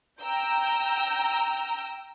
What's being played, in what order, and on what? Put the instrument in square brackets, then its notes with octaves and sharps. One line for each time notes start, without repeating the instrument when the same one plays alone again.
[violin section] G5 A#5 E6 G6